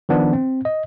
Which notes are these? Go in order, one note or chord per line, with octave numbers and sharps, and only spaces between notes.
D#3 F3 B3 D4
C4
D#5